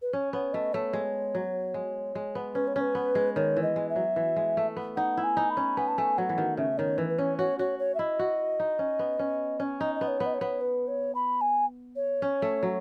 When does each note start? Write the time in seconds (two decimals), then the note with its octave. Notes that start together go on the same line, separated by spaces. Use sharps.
0.02 B4
0.13 C#4 C#5
0.33 B3 C#5
0.53 A3 D#5
0.73 A3 C#5
0.93 G#3
1.35 F#3
1.74 G#3
2.15 G#3
2.35 B3
2.55 C#4 B4
2.68 C#5
2.76 C#4 B4
2.95 B3
3.15 G#3
3.36 D#3 C#5
3.56 E3
3.63 D#5
3.76 G#3
3.90 E5
3.96 F#3
4.16 E3
4.36 G#3
4.57 A3
4.76 B3
4.96 D#4 F#5
5.17 E4
5.24 G#5
5.37 D#4
5.50 B5
5.57 C#4
5.77 B3 G#5
5.88 A5
5.98 A3 G#5
6.18 F#3 F#5
6.29 E3
6.38 D#3
6.57 C#3 E5
6.78 D#3 C#5
6.98 E3 B4
7.09 B4
7.18 C#4 C#5
7.38 F#4 C#5
7.59 F#4 C#5
7.79 C#5
7.95 E5
7.99 E4 D#5
8.19 F#4
8.60 D#4
8.79 C#4
8.99 B3
9.19 C#4
9.60 C#4
9.80 D#4 D#5
9.95 D#5
10.01 B3
10.08 C#5
10.20 B3
10.26 D#5
10.34 C#5
10.41 B3
10.61 B4
10.88 C#5
11.15 B5
11.41 G#5
11.96 C#5
12.22 C#4
12.42 A3
12.63 F#3